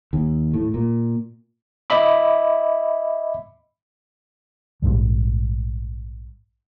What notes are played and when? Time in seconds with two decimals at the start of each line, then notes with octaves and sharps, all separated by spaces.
0.13 D#2
0.54 A2
0.74 A#2
1.90 D#5 E5 B5 D6
4.82 A#1 E2 G#2 G3